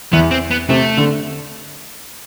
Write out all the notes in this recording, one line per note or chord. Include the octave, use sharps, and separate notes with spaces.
E2 E3 B3
C4
B3
C3 A3
D3